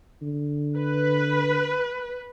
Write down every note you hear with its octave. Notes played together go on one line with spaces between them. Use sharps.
D3
B4